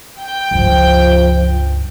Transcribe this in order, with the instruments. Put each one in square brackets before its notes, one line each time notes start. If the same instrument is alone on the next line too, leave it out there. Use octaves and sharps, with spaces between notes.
[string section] G5
[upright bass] C#2 G2 [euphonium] F3